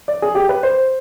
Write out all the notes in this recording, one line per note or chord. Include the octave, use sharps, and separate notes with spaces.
D5
G#4
G4
B4
C5